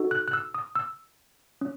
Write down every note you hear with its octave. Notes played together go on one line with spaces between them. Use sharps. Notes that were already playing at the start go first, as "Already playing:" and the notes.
Already playing: D#4 F#4 A4
F#6
F#6
E6
D#6
E6
C#4